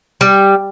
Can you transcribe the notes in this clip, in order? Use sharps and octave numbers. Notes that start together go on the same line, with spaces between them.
G3